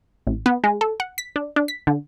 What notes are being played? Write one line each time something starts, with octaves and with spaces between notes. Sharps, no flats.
A1
B3
G#3
A4
F#5
B6
D4
D4
B6
D3